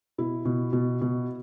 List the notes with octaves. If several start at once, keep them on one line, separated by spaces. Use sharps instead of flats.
B2 E4
B2
B2
B2